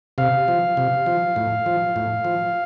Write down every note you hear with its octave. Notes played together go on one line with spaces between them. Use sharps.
C3 F5
F3
C3
F3
A2
F3
A2
F3